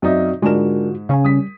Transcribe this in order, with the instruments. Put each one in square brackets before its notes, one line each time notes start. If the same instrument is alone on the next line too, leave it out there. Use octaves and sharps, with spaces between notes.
[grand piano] F#2 D#4 E5 [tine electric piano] C4 F#4 D5
[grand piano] G#2 E7 [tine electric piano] D3 F4 F#4 [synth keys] G#3 D4 A#4
[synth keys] C#3 C#4 [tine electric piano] F5 G#5
[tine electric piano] G3 [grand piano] D#6 B6